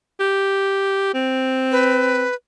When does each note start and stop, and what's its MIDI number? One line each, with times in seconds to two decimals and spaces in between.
0.20 1.11 67
1.14 2.25 60
1.71 2.35 71